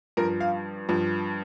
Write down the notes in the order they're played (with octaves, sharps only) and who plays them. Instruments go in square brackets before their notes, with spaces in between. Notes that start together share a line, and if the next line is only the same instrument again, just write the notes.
[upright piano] G2 F3 A#4
F5
G2 F3